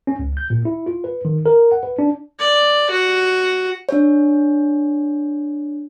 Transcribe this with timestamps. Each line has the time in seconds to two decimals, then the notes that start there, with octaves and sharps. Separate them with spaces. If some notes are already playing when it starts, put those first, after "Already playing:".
0.07 C#4
0.19 C#2
0.37 G6
0.50 A#2
0.65 E4
0.86 F4
1.04 B4
1.25 D#3
1.46 A#4
1.72 F#5
1.83 B4
1.99 D4
2.39 D5
2.90 F#4
3.89 D4 C#5